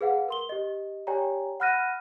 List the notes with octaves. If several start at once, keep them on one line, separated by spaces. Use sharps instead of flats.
G#4 B4 F5 F#5
A#4 C6 G7
G4 D#5
G4 C#5 D5 G5 G#5 A#5
F#5 B5 F6 F#6 A#6 D#7